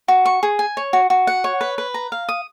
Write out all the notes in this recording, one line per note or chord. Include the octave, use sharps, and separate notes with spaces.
F#4
C#6
G#4
G#5
C#5
F#4
F#4
F#5
C#5
B4
B4
A#5
F5
D#6